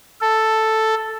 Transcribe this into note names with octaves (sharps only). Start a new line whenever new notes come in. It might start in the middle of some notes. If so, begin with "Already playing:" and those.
A4